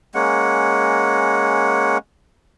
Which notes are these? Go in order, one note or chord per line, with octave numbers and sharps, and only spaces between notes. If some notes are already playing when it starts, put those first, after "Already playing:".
G#3 A#3 C#4 F#5